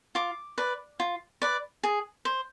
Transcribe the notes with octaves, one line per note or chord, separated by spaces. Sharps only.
F4 D6
B4 D5
F4
B4 D5
G#4
C5